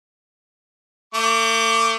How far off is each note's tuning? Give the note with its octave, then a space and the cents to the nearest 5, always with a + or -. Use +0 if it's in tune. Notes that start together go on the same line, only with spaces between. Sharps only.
A3 +45 D6 +0